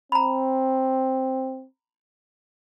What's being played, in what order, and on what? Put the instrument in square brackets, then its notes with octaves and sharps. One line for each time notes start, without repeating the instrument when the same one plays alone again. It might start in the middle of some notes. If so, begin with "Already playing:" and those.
[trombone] C4 [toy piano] A#5 B5